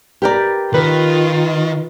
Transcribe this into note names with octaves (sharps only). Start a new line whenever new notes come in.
G4 A#4 B4 D5 G5 A#5
D#3 F4 B4